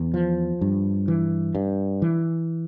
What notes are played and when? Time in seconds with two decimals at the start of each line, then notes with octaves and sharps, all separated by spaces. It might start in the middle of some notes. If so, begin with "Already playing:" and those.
Already playing: E2
0.14 F3
0.61 G2
1.08 E3
1.55 G2
2.02 E3